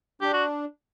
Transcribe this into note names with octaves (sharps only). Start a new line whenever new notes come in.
D4 G4
F#4